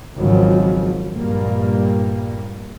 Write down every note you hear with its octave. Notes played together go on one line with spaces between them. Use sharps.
G#1 G#2 C#3 F3 F#3
A#1 G2 G3 A#3